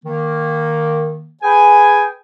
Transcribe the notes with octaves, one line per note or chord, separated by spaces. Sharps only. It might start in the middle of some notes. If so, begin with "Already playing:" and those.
D#3 A#3
G#4 B4 G5 G#5